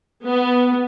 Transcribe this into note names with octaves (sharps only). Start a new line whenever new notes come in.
B3